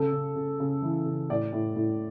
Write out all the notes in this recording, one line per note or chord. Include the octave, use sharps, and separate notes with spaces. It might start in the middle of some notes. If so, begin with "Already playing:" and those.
Already playing: C#3 A4
C#3
C#3
C#3
E3
C#3
A2 D5
A2
A2